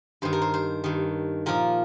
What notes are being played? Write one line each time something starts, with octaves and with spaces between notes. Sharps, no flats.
G2 D#3 C5
A#4
C5
C5
G2 D#3
A#2 F3 A#4